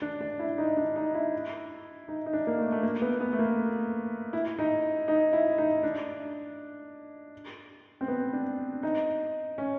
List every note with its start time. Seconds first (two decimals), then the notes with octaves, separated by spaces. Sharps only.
0.02 D4
0.21 D4
0.39 E4
0.58 D#4
0.77 D4
0.96 D#4
1.15 E4
2.08 D#4
2.26 D#4
2.33 D4
2.47 A#3
2.58 A3
2.72 A3
2.83 A#3
3.02 B3
3.21 B3
3.33 A3
3.39 A#3
4.33 E4
4.59 D#4
5.08 D#4
5.33 E4
5.58 D#4
5.83 D4
8.01 C4
8.08 B3
8.33 D4
8.83 D#4
9.58 C#4